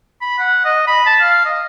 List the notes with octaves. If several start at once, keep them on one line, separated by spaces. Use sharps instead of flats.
B5
F#5
D#5
B5
A5
F5
D#5